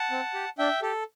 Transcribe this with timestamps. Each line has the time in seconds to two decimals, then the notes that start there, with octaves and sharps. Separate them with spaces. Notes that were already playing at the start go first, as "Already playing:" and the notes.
Already playing: F#5 A5
0.11 C4
0.34 G4
0.59 D4 E5 G5
0.82 G4 A4